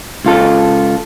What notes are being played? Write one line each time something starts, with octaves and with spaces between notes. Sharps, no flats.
C#2 F4 A4